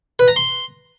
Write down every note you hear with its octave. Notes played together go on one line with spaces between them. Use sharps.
B4
A#5
C6